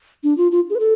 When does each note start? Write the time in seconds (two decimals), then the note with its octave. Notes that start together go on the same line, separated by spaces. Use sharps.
0.24 D4
0.38 F4
0.52 F4
0.70 G#4
0.75 B4
0.80 A4